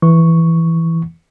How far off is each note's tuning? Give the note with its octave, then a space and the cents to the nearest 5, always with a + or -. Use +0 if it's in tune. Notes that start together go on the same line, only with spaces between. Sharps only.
E3 +0 C#6 +0